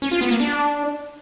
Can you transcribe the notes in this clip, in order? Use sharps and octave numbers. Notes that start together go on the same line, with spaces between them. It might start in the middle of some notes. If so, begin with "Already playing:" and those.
C#4
F4
B3
A#3
D4